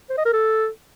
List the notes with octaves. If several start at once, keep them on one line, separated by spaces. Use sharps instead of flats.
C5
D#5
A#4
A4